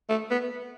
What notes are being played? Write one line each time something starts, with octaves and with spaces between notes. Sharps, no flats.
A3
B3